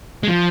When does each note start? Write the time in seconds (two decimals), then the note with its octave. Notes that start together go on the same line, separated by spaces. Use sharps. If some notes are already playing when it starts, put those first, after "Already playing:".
0.23 G#3
0.28 F3